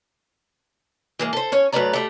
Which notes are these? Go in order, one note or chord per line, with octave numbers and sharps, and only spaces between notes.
E3 G#3 A#3
A4 C5
C#4 C#5
F#2 F#3 A3 B4 D5 A#5
G3 A3